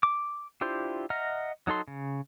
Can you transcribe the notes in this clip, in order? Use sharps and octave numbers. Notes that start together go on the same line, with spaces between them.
D6
D4 E4 F4 G4 C5
D#5 E5 F#5 A#5 F6
F#3 D#4 A4 C6
C#3